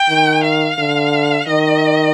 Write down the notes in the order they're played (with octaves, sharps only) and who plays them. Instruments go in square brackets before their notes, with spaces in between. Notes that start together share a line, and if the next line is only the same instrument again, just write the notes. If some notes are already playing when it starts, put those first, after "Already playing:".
Already playing: [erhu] G5
[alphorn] D#3
[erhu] F5
[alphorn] D3
[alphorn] D#3 [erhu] D#5